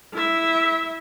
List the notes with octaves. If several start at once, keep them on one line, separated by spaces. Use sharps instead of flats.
E4 E5